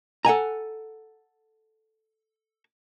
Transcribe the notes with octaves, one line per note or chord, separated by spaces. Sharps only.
A4 F#5 G#5 A#5